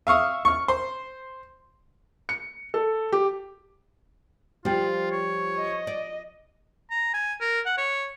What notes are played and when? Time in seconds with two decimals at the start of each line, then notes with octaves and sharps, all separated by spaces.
0.07 E5 F5 C#6 D#6
0.45 C#6 F6
0.68 C5
2.29 C#7
2.74 A4
3.12 G4
4.65 F3 G3 F4 G5
5.11 C#5
5.57 D#5
5.87 D5
6.91 A#5
7.14 G#5
7.41 A#4
7.66 F#5
7.78 C#5